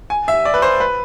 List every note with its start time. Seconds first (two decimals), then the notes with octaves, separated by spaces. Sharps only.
0.10 G#5
0.28 E5
0.45 D5
0.54 B4
0.62 C5
0.80 B4